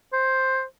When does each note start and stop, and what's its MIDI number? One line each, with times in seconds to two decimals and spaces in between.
0.13 0.63 72